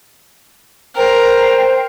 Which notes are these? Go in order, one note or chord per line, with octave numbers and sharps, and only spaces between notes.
A#4 C5 G5 A#5